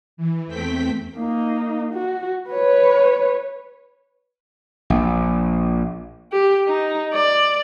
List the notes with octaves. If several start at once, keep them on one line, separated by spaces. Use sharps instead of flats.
E3
E2 A3 C4 G5 B6
A#3 D#4
F#4
B4 C#5
A#1
G4
D#4
D5